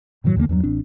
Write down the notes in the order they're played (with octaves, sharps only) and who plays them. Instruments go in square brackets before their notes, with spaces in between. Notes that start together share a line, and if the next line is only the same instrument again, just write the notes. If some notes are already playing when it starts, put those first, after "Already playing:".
[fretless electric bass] F#2 A2 D#3 F#3
D#2 D3 G3 A#3
E2 G2 F#3
A1 C4 D4